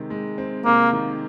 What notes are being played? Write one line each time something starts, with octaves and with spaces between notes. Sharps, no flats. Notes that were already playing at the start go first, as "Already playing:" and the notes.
Already playing: C3 D#3 G#3 C4
G#3
C4
C3 A#3
D#3